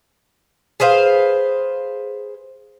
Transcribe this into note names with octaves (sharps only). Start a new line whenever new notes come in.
G#4 B4 C5 F5